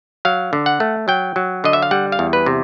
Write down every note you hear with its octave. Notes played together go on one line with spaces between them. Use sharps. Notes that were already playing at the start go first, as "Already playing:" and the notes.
F#3 F5
D3
F#5
A3
F#3 G5
F#3
D3 D#5
E5
F5
G3 F#5
F5
E2
B4
C3